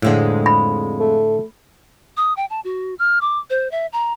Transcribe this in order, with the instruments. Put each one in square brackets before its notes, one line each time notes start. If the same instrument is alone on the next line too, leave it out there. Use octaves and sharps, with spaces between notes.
[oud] F2 G#3 C4 [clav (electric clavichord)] A2 D3
[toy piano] B5
[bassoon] A3
[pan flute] D#6
G5
A5
F#4
F6
D6
C5
E5
A#5